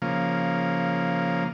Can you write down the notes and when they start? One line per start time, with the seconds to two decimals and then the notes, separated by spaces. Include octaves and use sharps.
0.02 C#3 F3 A#3